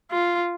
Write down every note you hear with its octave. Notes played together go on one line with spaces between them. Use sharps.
F4